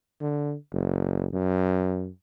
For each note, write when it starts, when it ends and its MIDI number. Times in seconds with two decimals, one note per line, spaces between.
0.21 0.55 50
0.73 1.27 30
1.33 2.08 42